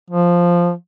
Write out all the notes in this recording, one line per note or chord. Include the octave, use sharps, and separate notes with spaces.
F3